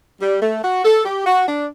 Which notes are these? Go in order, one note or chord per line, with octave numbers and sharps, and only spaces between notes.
G3
A3
F#4
A4
G4
F#4
D4